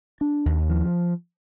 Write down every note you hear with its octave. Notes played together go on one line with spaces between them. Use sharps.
D4
D#2
F3